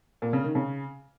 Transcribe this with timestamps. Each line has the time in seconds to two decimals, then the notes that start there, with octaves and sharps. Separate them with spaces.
0.22 A#2
0.33 C#3
0.44 D#3
0.55 C#3